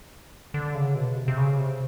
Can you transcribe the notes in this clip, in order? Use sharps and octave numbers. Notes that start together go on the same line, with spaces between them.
D3
C#3
B2
C3
C3
C#3
C3